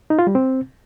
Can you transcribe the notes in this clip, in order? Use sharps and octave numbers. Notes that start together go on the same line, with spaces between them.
D#4
F4
G3
C4